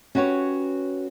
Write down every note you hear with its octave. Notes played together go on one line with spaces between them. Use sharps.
C#4 F#4 G4 B4 C#5